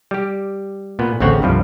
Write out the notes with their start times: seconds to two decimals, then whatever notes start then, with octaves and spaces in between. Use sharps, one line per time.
0.11 G3 G4
0.99 A#2 B3
1.20 A1 D2 C#3 C4 C#5 F#5
1.42 C2 G2 F3 G3